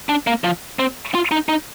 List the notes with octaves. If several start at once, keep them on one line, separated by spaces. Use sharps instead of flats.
D4
A#3
F3
C4
F4
D#4
D#4